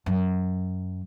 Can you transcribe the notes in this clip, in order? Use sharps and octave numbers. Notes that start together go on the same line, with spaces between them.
F#2